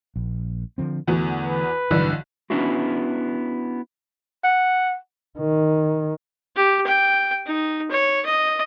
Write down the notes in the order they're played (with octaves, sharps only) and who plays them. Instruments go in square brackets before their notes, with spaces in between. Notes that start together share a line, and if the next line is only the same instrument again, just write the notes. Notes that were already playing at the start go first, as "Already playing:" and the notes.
[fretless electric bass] A#1
D3 F3 C4
[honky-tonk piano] E2 B3 F#4 [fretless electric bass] D3 E3 A3
[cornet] B4
[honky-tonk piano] B1 D3 E3 [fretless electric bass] G2
[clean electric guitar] B3 C#4 D4 E4 F#4
[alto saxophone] F#5
[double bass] D#3
[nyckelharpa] G4
G5
D#4
C#5
D#5